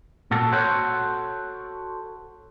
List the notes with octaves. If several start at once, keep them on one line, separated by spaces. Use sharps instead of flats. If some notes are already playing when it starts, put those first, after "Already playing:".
A#2 F#4 A4
F#4 A4 C5 C#5 F#5